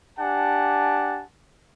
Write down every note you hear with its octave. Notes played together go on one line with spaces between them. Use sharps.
D4 G4 F#5 G#5 A5